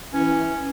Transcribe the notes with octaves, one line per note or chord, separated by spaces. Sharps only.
E3 C#4